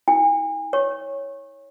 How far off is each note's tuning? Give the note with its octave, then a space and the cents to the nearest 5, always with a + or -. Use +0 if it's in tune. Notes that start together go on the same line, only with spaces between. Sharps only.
E4 -45 G#5 -40
C#5 +0 C#6 -30